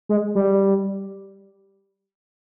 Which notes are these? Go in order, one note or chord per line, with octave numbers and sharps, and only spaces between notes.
G#3
G3